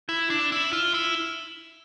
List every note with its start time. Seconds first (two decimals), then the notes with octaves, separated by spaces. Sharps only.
0.09 E4
0.30 D4
0.52 E4
0.73 F4
0.94 E4